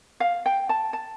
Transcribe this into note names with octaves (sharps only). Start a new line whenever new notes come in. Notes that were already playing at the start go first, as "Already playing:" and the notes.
F5
G5
A5
A5